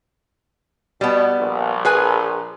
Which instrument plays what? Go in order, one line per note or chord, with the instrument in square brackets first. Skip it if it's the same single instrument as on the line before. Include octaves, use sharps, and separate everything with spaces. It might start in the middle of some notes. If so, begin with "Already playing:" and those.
[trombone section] B2 [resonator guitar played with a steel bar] G3 B3
[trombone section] A#1
[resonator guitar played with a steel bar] G#4 B4 G#5